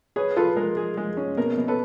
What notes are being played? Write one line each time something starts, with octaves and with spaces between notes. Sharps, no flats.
G#4 B4 C#5
F4 A4 B4
G#3 A#4
G#4
G#3
C#4
B2 A#4
B2
A4 B4